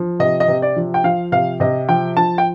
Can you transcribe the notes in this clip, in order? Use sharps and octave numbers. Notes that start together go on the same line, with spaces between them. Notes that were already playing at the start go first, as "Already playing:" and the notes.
Already playing: F3
C3 D#5
D#5
C3
D5
F3
G5
F3 F5
C3 F5
C3 D#5
F3 G5
F3 A5
G5